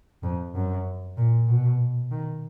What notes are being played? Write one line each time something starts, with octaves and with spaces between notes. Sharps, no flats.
F2
F#2
A#2
B2
D#3